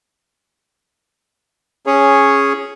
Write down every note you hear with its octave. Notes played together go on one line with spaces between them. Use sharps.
C#4 G#4 C#5